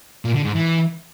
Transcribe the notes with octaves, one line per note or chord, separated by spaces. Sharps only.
A#2
D3
G#2
E3